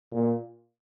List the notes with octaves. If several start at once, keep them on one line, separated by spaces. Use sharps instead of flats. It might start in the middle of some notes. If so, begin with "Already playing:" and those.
A#2